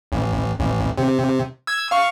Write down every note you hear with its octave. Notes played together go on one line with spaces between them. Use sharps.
A1
A1
C3
E6 G#6
F5 C#6